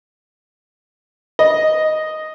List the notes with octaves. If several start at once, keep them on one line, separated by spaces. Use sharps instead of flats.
D#5